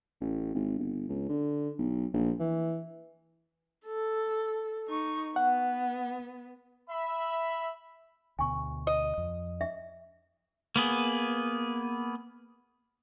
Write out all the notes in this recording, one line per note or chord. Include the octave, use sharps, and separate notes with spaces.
A1
G#1
G1
C#2
D3
B1
A#1
E3
A4
D#4 C#6
B3 F#5
E5 B5
D2 B2 G#5 C#6
D#5
F2
E5
A#3 B3 G#4